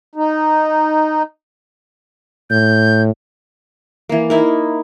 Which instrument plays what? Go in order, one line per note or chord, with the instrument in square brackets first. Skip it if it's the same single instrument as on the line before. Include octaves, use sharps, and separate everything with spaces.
[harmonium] D#4
[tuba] A2 [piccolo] G6
[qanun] E3 A#3
D#4 E4 A#4